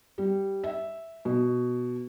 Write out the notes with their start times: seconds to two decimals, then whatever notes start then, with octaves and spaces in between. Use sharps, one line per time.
0.18 G3
0.64 E5
1.25 B2